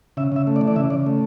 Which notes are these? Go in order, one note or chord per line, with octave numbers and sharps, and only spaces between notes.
C#3 E5
C#3 E5
A3
D5
E3
D5
C#3 E5
C#3 D5
A3